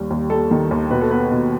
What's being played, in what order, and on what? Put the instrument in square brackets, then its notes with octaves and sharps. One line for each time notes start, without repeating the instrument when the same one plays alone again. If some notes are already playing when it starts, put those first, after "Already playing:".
Already playing: [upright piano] D#2 G3 G4
D#2
G3 A4
D#3
D#2
B2 B4
A4
B3 B4
B2